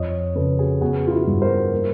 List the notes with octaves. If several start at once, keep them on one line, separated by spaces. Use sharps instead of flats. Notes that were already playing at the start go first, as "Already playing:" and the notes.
Already playing: F2 C#5 D#5
C#3 A4 B4
F#4 G#4
B3 F#4 G#4
F4
E4 F#4
G2
A#4 C5
A#3